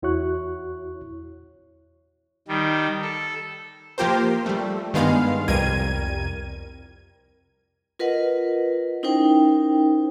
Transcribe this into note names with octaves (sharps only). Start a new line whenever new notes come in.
E2 E4 F#4 C#5 C#6 F#6
D#3 G3
A4
F3 A#3 F4 G4 A#4 C5
G3 A3
G2 D#3 G#3 B3 F5
C2 F2 G3 A#4 G#6 D#7
F4 A#4 B4 D#5 F#5
C#4 D#4 E4 A#4 C5 G5